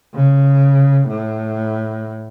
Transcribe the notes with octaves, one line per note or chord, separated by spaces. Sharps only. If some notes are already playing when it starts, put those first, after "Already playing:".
C#3
A2